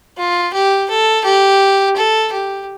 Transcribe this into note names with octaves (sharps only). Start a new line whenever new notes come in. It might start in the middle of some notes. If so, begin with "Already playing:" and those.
F4
G4
A4
G4
A4
G4